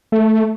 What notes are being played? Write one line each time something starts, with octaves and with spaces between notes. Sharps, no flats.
A3